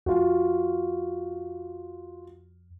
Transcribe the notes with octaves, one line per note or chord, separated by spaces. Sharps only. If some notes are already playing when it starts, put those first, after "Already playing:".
F2 F4 F#4